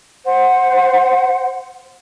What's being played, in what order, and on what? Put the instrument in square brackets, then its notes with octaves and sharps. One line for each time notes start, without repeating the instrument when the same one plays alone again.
[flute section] C5 F#5